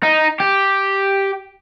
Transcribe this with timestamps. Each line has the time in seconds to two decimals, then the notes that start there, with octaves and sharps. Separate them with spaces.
0.03 D#4
0.40 G4